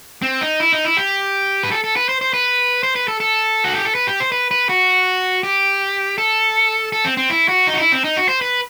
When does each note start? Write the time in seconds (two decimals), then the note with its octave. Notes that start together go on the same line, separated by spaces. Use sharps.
0.22 C4
0.41 D#4
0.60 E4
0.72 D#4
0.85 E4
0.97 G4
1.63 B4
1.71 A4
1.84 A4
1.96 B4
2.09 C5
2.21 C5
2.33 B4
2.83 C5
2.96 B4
3.08 A4
3.20 A4
3.64 F#4
3.75 G4
3.85 A4
3.95 B4
4.07 G4
4.20 C5
4.32 B4
4.51 B4
4.69 F#4
5.43 G4
6.18 A4
6.92 A4
7.05 C4
7.17 C4
7.30 E4
7.48 F#4
7.67 D#4
7.73 F#4
7.79 E4
7.92 C4
8.04 D#4
8.17 F#4
8.29 C5
8.41 B4